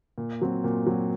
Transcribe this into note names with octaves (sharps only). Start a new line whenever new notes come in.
A#2
F#3 C4
A#2
F#3 C4